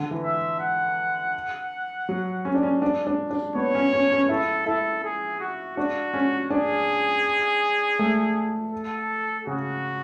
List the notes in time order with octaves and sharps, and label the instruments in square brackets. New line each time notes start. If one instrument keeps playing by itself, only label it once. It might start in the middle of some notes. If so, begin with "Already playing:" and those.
Already playing: [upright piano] D3
E3
[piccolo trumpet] E5
F#5
[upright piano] F#3
C#4
D4
C#4
D4
D4
D4
[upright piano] B3 [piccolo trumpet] C#5
[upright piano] C#4
C#4
C#4
[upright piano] E4 [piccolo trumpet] A4
[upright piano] E4 [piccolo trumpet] A4
[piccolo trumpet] G#4
F#4
[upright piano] D4 [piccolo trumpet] F#4
[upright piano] C#4
[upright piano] D4 [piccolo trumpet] G#4
[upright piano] A3
[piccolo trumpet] A4
[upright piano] C#3 [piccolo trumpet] F#4